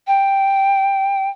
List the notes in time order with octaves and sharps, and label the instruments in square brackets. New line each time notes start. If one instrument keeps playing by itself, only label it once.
[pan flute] G5